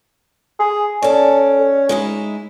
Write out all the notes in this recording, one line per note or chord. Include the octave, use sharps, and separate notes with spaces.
G#4
C#4 A4 D5
G#3 D#4 E4